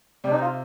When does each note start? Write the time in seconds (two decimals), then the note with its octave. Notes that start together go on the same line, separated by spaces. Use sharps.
0.24 C3 G3
0.32 D#4
0.42 F4